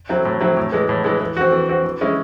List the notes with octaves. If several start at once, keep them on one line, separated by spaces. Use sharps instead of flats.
F#3 C4 E4
A2
F#3 C4 E4
A2
E3 G#3
A2
E3 G#3
E3
C4 F#4
E3
C4 F#4
E3
G#3 C#4 E4